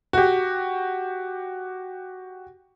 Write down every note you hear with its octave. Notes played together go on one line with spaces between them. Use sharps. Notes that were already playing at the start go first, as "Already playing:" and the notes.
F#4 G4